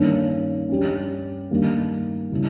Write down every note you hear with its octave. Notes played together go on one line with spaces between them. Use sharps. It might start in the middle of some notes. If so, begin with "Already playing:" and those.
Already playing: G2 D#3 A#3 C#4
G2 G3 C#4
G2 D#3 G3 A#3
C#3 G3 C#4 E4